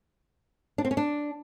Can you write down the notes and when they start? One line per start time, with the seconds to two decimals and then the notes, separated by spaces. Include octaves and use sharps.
0.78 D4
0.85 C4
0.91 C#4
0.97 D4